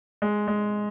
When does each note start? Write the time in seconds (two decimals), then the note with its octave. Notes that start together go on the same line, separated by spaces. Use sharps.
0.22 G#3
0.48 G#3